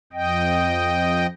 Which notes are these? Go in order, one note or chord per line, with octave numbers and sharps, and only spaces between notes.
F2 D#5 G5